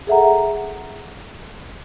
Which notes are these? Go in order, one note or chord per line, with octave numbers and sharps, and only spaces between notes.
G#4 A4 E5 F#5 A#5